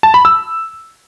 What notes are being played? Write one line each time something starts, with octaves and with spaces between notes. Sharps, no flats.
A5
B5
E6